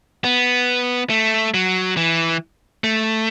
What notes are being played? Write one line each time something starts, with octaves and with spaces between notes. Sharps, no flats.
B3
A3
F#3
E3
A3